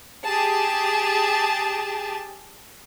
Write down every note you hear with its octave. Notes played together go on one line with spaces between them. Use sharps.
G4 G#4 A5